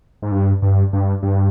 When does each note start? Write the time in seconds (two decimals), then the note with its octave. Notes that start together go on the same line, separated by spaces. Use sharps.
0.22 G#2
0.32 G2
0.62 G2
0.93 G2
1.23 G2